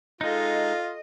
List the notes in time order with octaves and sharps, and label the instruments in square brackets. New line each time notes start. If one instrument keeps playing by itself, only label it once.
[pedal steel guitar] G#3 D#4 [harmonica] F4 [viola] A4 [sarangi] D#5